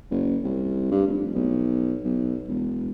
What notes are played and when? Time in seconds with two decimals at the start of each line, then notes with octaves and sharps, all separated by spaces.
0.10 F#1
0.44 C2
0.91 G2
1.07 F1
1.35 B1
2.05 B1
2.48 E1